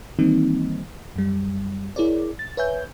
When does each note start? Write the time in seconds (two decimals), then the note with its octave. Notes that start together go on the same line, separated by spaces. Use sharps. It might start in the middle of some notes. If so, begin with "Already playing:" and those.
0.19 D#3 E3 G3 A#3 C4 D#4
1.15 F#2 G3
1.96 E4 G#4 A#4 C#5 D5
2.39 A6
2.57 B4 C#5 E5 G#5 G6